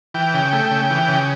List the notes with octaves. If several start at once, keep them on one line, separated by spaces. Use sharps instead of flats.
E3 G5
C#3
A3
C#3
E3
C#3